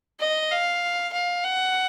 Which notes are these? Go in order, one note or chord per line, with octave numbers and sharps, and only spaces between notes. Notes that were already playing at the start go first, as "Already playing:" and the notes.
D#5
F5
F5
F#5